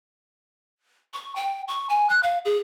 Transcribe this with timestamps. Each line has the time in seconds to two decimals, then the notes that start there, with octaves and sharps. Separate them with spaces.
1.14 C#6
1.36 G5
1.68 C#6
1.89 G#5
2.09 F#6
2.23 F5
2.45 G#4